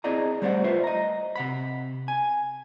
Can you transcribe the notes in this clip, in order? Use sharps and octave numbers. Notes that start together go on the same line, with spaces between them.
C4 E4 G#4 D5 D#5 A#5
G3 A3 C5 D5 E5 F#5
F4 B4 C5 E5
D#5 A#5
C3 F#5 B5
G#5